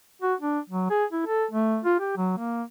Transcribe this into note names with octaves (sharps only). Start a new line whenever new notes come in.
F#4
D4
F#3
G#4
E4
A4
A3
F4
G4
F#3
A#3